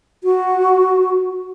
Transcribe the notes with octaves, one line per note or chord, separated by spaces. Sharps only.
F#4